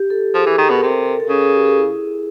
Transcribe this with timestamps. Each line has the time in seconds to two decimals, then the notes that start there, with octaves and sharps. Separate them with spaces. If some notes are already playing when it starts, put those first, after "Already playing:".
Already playing: G4
0.10 A4
0.34 F3 G#4
0.46 E3
0.58 D#3
0.70 B2
0.75 A#4
0.81 C3 A4
1.06 A4
1.20 A4
1.29 C#3 G#4
1.41 G#4
1.54 G4
1.65 G#4
1.77 E4